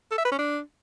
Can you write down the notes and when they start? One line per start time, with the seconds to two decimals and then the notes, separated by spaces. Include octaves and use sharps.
0.11 A4
0.18 E5
0.25 B4
0.32 C#4
0.39 D4